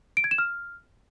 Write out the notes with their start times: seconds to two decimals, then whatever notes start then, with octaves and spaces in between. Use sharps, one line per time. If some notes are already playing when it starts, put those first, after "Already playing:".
0.17 D7
0.24 G#6
0.31 E7
0.38 F6